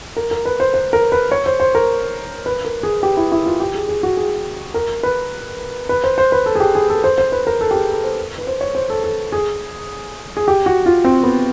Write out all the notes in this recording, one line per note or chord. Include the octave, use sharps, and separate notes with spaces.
A#4
A#4
B4
C5
C5
A#4
B4
C#5
C5
C5
A#4
B4
A#4
G#4
G4
E4
E4
F4
G4
G#4
G#4
F#4
G#4
A#4
B4
B4
C5
C5
B4
A4
G#4
G4
G#4
A4
C5
C5
B4
A#4
A4
G4
G#4
A4
C5
B4
C5
C#5
C5
A4
A4
G#4
G#4
G4
F#4
F4
C4
B3